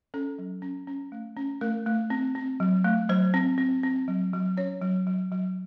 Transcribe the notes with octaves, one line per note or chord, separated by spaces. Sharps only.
C#4 A4
F#3
C#4
C#4
A3
C#4
A3 A#4
A3
C4
C4
F#3
A3
F#3 C5
C4
C4
C4
F#3
F#3
C#4 C#5
F#3
F#3
F#3